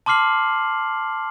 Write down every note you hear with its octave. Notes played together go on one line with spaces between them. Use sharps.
A5 C6 D6 F6 C7 F#7